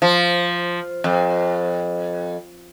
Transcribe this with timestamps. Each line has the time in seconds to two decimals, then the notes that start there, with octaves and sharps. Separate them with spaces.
0.02 F3
1.04 F2